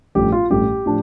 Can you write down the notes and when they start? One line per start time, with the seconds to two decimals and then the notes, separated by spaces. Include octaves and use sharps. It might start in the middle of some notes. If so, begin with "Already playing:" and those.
0.15 A1 G2 F3 A3 G4
0.32 F4
0.50 A1 G2 F3 A3 G4
0.86 A2 F3 D4